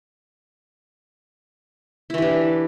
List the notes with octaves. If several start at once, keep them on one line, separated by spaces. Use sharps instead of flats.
E3 D4 E4 G4